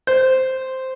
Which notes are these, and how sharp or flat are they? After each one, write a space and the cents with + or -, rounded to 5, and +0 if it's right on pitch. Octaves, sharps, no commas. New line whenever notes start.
C5 -5